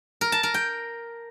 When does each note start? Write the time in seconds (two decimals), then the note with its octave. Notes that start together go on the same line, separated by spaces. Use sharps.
0.21 A#4
0.32 A5
0.43 A#4
0.54 G5